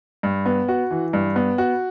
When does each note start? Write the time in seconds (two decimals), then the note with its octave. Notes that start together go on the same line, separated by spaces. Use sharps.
0.23 G2
0.46 B3
0.69 F#4
0.91 E3
1.13 G2
1.36 B3
1.58 F#4